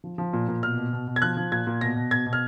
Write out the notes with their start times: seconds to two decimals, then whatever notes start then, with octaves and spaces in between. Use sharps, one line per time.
0.04 F3
0.18 F3
0.33 A#2
0.48 A#2
0.63 B2 F6
0.77 B2
0.93 B2
1.07 B2
1.16 G#6
1.22 F3 F#6
1.37 F3
1.52 A#2 G#6
1.67 A#2
1.81 B2 A#6
1.96 B2
2.11 B2 G#6
2.26 B2
2.33 F6